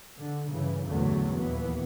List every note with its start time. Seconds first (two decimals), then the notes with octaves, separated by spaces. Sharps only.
0.19 D3
0.50 G2 C#3 E3
0.87 A#1 E2 G2 D3 F#3 A3
1.35 D#2 A#2 E3 B3